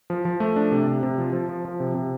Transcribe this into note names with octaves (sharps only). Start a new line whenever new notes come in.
F3
F3
A3
D4
C3
C3
C3
F3
F3
F3
F3
C3
C3